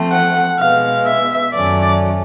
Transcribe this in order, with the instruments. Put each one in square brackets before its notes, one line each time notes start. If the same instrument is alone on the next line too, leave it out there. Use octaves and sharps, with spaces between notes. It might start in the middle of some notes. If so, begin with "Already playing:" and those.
Already playing: [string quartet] F3 A3 C4
[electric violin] F#5
[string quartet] B2 G#3 B3 [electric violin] F5
[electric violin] E5
[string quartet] F#2 D#3 F#3 A3 C#4 [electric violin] D5